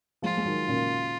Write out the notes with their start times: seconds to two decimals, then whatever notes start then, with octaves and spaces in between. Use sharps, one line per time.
0.22 F3 G#3 F4
0.37 G#3
0.45 D#3 F#3
0.68 A#2 C#3